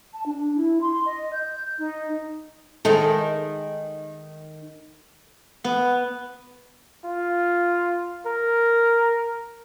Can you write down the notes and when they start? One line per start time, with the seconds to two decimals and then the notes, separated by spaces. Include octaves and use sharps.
0.12 A5
0.25 D4
0.55 E4
0.81 C6
1.05 D#5
1.33 G6
1.78 D#4
2.85 D#3 G#3 D#4 A4
5.64 B3
7.04 F4
8.26 A#4